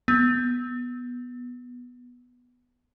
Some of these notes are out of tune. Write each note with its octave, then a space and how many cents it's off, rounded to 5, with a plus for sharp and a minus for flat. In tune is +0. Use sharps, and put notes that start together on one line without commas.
B3 -5